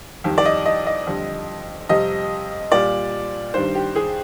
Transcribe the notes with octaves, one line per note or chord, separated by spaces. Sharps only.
F2 D#3 G3
D5
D#5
D#5
D#5
F2 D3 G3
F2 C3 G3 D#5
A#2 G3 D5
G2 D#3 G3 C5
G4
G#4